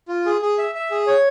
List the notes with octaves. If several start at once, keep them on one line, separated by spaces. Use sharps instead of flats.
F4
G#4
G#4
E5
E5
G#4
C#5